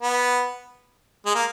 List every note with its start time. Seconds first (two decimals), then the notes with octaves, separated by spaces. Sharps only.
0.02 B3
1.26 G#3
1.35 A#3